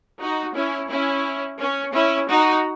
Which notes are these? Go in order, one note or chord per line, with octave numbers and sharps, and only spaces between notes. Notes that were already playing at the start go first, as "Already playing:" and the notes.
D#4 F#4
C#4 E4
C#4 E4
C#4
C#4 E4
D#4 F#4